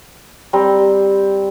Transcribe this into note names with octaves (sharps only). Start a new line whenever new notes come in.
G3 C4 A#5